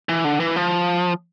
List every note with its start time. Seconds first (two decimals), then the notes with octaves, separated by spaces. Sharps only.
0.09 E3
0.25 D3
0.40 E3
0.56 F3